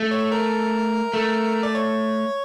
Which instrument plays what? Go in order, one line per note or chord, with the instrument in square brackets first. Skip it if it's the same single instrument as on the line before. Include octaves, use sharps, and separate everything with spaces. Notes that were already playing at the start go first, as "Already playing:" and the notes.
Already playing: [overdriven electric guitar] A3
[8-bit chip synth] C#5
A#4
[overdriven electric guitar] A3
[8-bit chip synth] D5
C#5